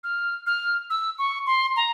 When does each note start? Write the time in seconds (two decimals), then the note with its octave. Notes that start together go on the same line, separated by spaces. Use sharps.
0.04 F6
0.46 F6
0.90 E6
1.19 C#6
1.47 C6
1.76 A#5